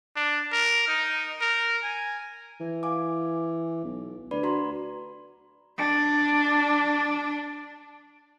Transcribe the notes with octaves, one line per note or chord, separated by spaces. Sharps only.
D4
A#4
D#4
A#4
G#5
E3
F5 G#5 D6
B1
D2 B4 D5 B5
F#4 A#5 C6
D4 D5